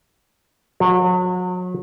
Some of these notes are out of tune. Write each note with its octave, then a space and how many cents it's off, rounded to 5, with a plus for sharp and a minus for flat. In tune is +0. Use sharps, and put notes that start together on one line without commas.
F#3 -35